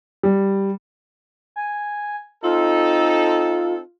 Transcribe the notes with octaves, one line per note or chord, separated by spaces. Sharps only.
G3
G#5
C4 D#4 F4 A4